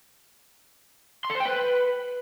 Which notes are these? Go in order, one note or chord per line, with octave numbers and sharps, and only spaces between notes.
C6
A4
C5
G5
B4